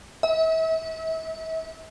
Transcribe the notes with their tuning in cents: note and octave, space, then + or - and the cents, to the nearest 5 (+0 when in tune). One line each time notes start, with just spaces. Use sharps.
E5 -35